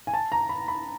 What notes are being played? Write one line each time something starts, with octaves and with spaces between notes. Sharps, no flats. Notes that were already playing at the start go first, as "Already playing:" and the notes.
G#5
A5
A#5
B5
B5